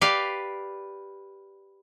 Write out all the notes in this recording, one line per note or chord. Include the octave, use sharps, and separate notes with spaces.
G4 B4 D5 F5